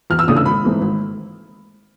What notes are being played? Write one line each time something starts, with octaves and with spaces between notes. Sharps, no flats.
E2 F6
E6
C#3 E3 A3 D4 D#6
E6
G#1 B5
G#2 E3 A3 C4
G#1